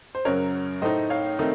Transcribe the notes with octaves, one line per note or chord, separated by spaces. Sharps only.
C5
F#2 C#3 F#3 A#4 C#5
A2 A3 D#4 C5 D#5
C#5 F5
D#3 A3 C4 D#4